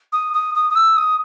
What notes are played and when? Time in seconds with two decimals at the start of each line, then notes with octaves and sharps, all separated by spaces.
0.13 D#6
0.34 D#6
0.55 D#6
0.70 D#6
0.76 E6
0.97 D#6